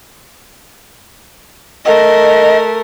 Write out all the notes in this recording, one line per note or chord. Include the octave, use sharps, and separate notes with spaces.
A3 A#4 D#5